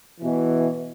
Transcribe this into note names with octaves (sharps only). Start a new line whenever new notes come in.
B2 E3